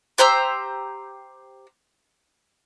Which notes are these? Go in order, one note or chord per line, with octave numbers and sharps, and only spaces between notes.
G4 C5 A#5 E6